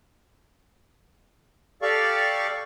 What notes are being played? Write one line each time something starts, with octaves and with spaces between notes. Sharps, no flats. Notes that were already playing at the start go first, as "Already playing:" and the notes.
G4 A4 D5 F5 C#6